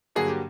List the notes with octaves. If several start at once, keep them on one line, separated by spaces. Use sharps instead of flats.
G2 D3 F#3 A#3 G#4
G4